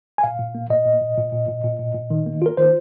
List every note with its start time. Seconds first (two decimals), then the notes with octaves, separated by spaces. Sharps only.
0.18 G#5
0.23 A#2 F5
0.39 A#2
0.55 A#3
0.70 A#2 D#5
0.86 A#2
1.01 A#2
1.17 A#2
1.33 A#2
1.48 A#2
1.64 A#2
1.80 A#2
1.95 A#2
2.10 D#3
2.26 A#3
2.42 F4 A#4
2.57 D#3 C5